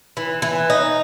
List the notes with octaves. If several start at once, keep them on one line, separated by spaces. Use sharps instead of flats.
E3
E3
D#4